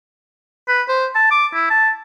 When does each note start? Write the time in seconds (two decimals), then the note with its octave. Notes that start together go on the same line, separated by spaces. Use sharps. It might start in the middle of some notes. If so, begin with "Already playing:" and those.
0.68 B4
0.89 C5
1.15 A5
1.31 D6
1.54 E4
1.70 A5